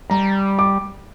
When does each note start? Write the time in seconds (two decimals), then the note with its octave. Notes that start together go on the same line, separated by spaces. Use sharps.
0.10 G3 A#5
0.59 D6